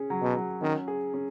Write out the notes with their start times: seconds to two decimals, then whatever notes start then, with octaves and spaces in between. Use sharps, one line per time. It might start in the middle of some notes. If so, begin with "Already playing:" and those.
Already playing: C#4 G#4
0.10 F#3
0.22 B2
0.37 F#3
0.62 D#3 C#4
0.88 G#4
1.14 C#4